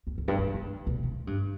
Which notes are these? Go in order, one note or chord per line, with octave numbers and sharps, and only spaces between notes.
G2
F2
G2
G2
G#2
B2
G#2
G2